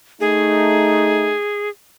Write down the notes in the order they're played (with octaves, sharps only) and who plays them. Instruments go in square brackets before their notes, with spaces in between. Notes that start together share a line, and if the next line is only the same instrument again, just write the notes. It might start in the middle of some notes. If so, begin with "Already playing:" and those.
[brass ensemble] A3 D#4 [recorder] G#4